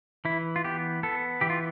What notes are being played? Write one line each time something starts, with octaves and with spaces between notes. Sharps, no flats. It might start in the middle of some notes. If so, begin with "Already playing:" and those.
E3 E4
F4
B3 G4
B3 A4
E3 G4
F4